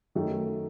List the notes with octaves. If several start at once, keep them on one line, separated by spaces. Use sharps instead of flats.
F#2 D#3 F#3 A3 D#4